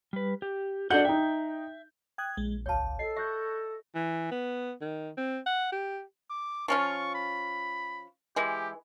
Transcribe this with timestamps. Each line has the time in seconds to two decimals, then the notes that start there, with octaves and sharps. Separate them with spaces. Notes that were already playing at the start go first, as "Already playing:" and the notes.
0.13 G3 B4
0.42 G4
0.90 D4 F#4 A4 D#5 F#5 G6
1.05 D#4 E5 G5
2.18 G5 D#6 F#6 G#6
2.37 A#1 G#3
2.66 G1 C#2 C#5 F5 A5
2.99 A4 D#5 C7
3.16 E5 C#6 F#6 G6 A#6
3.95 E3
4.31 B3
4.81 D#3
5.18 C4
5.46 F#5
5.73 G4
6.30 D6
6.68 F3 C#4 F4 C#6
7.14 B5
8.36 E3 G#3 G4